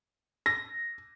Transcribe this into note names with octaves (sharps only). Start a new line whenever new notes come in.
A#6